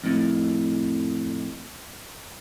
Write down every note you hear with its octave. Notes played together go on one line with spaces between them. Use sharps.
F2 A2